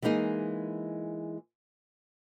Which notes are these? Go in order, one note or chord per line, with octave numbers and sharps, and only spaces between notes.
E3 G#3 A#3 D#4 G#4